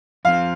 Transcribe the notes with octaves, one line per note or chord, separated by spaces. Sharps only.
F2 F3 C4 F5